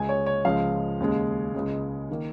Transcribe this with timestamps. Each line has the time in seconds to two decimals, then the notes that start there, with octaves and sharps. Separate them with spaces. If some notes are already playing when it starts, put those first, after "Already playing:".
Already playing: C#2 C#3 G#3 G#5
0.09 C#5
0.26 C#5
0.45 C#2 C#3 F3 G#3 F5
1.00 D#2 C#3 G#3
1.54 C#2 C#3 G#3
2.11 D#3 A#3